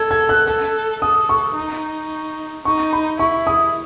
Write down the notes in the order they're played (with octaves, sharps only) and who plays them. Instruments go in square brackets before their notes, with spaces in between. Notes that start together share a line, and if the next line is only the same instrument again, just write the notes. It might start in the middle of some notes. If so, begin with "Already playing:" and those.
Already playing: [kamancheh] A4 [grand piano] G#6
[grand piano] G#6
F#6
[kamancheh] A4 [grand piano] F#6
[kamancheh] A4 [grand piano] D#6
[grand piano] C#6
[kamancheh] D#4
[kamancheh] D#4 [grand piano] C#6
[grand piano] B5
[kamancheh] E4 [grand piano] C#6
[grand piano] D#6